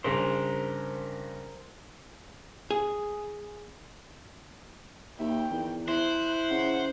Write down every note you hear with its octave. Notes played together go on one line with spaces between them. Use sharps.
G2 C#3 A#4 C5
G#4
D#2 E5 G5
E2 D#3
E4 C5 F#6
C#3 F#5